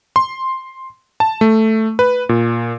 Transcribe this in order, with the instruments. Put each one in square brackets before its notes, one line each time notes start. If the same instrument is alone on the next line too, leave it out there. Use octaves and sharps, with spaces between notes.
[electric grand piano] C6
A5
A3
B4
A#2